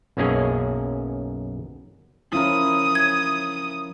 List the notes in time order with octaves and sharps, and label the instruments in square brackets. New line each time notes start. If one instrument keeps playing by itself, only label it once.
[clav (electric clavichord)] B1 F#2 A#3 C#4 G#4 G#5
[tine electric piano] F3 F4 A#4 [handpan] C#4 E4 [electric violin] D#6
[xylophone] G#6